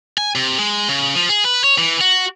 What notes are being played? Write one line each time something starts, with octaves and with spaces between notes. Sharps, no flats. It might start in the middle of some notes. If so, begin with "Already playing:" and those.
G#5
C3
G#3
C#3
F3
G#4
B4
C#5
E3
F#4